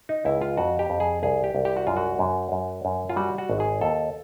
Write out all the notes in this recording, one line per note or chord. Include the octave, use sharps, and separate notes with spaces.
D#4
C#2 E4
F4
F2 F#4
G4
F2
G#4
C2 G#4
G4
C2
G4
F#4
F#2 F4
F#4
F#2
F#2
F#2
F4
G3 F#4
F#4
G#1
G#4
D#2 A4